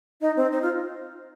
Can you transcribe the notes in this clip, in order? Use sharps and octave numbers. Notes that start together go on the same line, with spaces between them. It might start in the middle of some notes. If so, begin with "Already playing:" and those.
D#4 D#5
C4
D#4 C5
F4